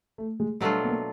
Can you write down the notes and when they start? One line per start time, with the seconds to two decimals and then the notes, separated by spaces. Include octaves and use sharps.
0.18 A3
0.40 G#3
0.61 B2 F#3 G3 A3 D4 F4
0.84 B3
0.89 A#3